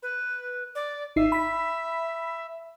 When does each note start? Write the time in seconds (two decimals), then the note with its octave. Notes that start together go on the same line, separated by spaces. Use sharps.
0.02 B4
0.75 D5
1.16 G#1 D#4 E5 C7
1.32 B5 B6